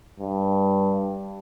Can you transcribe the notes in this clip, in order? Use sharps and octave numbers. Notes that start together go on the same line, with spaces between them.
G2